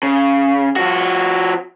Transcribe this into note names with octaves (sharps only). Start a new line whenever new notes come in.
C#3
F3 F#4